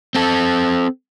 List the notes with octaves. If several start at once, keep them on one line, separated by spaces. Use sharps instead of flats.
C4 A4